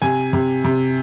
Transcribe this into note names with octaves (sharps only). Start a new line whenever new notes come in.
C3 G#5
C3
C3